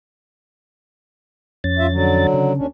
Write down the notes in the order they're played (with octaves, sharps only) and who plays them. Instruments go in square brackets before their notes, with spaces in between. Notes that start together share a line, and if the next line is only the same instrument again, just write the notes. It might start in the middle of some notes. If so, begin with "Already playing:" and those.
[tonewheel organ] F2 C#4 A6
[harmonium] F#2 F4 E5
D3 F#3
[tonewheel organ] C#3
[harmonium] D#2 C#4 D4